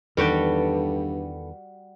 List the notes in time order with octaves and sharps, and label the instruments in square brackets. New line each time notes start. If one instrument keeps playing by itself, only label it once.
[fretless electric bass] E2 D#3 [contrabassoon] G2 [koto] G3 F#4 G4 [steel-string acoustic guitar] A4 B4